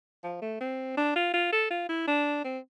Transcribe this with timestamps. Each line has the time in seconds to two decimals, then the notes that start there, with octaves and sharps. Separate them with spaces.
0.24 F3
0.42 A3
0.60 C4
0.97 D4
1.16 F4
1.34 F4
1.53 A4
1.71 F4
1.89 E4
2.07 D4
2.45 C4